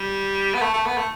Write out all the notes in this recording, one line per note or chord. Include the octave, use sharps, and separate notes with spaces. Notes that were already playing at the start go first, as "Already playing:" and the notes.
Already playing: G3
B3
A3
A3
B3
A3